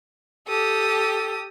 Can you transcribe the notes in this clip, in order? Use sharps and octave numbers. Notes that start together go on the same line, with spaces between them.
G4 A4 D#6